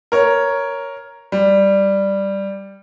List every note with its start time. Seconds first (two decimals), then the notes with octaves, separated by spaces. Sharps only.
0.12 A#4 C#5
1.32 G3